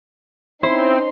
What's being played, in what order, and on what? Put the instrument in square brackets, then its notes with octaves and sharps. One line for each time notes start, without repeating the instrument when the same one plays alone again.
[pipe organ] C4 [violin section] C#4 D#4 C6 [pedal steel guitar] E4 [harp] C5